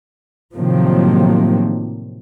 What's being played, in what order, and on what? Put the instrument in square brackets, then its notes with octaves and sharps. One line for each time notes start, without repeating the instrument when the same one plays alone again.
[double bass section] A2 C3 D#3 F3 F#3 A#3